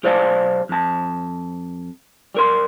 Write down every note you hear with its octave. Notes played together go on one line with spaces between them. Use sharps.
B1 G4 C5 D5 F5 A5
F2 A5
G3 A#4 C6